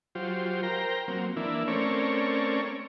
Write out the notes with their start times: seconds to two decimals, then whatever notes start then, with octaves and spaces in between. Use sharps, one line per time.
0.15 F#3 F4 G4 C5
0.63 A#4 C5 G5 A#5
1.08 F#3 A#3 C4
1.36 E3 A#3 D4 E4
1.67 A3 C4 C#4 A#4 C#5 D5